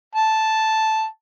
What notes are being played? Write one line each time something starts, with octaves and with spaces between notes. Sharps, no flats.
A5